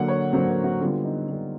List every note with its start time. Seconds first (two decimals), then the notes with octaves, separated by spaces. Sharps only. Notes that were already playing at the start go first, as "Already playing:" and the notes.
Already playing: D3 F#3 A#3 F#5
0.08 C#5
0.33 D3 F#3 A#3 C5
0.49 A#4
0.64 F#4
0.80 D3 G3 B3 F4
1.05 D#4
1.28 D3 G3 B3